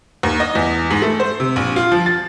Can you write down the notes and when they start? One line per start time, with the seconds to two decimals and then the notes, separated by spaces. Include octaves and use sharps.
0.23 D#2
0.40 D#5
0.55 E2
0.90 G#2
1.02 A3
1.20 C5
1.40 C3
1.56 A#1
1.76 F4
1.92 F3
2.06 A6